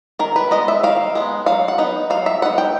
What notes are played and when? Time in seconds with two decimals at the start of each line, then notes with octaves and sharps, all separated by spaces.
0.19 D#3 A#4
0.36 B4
0.51 G#3 B3 D#5
0.68 E5
0.83 D#3 F5
1.15 G#3 B3
1.46 F#3 F5
1.68 F#5
1.78 B3 D#4
2.10 F#3 F5
2.26 E5
2.42 B3 D#4 F#5
2.58 G5